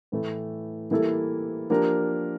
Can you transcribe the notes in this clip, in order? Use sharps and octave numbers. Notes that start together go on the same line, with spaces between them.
A2 E3 A3
E3 G3 A#3 E4 A4
F3 A#3 D4 G4 A#4